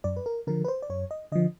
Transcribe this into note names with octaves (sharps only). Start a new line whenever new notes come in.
F#2 D5
B4
A#4
D3 F3 A#4
B4
C5
D5
F#2 C#5
D#5
D3 F3 D#5